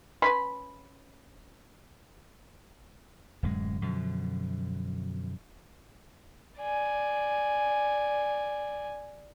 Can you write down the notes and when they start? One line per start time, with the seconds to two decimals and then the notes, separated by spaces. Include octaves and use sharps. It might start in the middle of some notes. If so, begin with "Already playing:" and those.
0.22 C#4 B4 B5 C6
3.43 D1 F#2 G#3
3.82 F#2 B2 D3 F3
6.60 D5 G#5